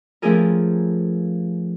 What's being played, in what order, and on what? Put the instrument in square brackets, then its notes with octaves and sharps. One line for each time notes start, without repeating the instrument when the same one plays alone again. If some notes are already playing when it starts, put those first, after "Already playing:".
[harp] F3 A3 C#4 G4 G#4 A#4